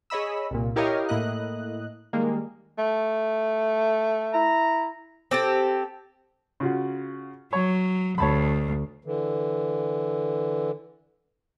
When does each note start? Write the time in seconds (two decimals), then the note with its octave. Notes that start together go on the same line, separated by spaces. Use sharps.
0.10 G#4 C#5 D#5 B5 E6
0.51 C2 A#2
0.76 E4 G4 A#4 C#5 D#5 F5
1.09 A2 A#3 E4 D#5 F#6
2.13 D#3 G3 G#3 A#3
2.78 A3
4.34 E4 A#5
5.31 C4 G4 A4
6.60 C#3 F4 F#4
7.53 F#3 C#5
8.18 D2 C#5 A5 B5
9.05 D3 E3